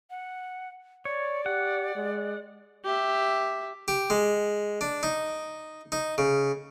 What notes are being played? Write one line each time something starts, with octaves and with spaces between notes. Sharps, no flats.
F#5
C#5 D5
G4 F#5
G#3
G4 E5
G4
G#3
D4
D#4
D#4
C#3